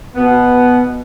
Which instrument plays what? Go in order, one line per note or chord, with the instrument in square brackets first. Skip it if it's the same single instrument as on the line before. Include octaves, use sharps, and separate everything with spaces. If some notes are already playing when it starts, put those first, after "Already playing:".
[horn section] B2 B3